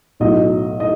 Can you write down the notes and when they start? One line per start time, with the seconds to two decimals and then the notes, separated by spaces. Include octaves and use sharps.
0.20 B1 A2 F#3 D#5
0.80 D#5